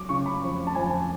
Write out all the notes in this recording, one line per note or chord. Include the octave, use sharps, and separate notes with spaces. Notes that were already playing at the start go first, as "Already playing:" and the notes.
Already playing: F#3 D6
C#3 C#6
B5
F2
A5
F2 G#5